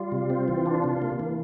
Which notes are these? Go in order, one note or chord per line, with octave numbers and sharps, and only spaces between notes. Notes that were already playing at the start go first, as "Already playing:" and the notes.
Already playing: G3 F4
C3
C4
E3
D4
C3
A#3
E3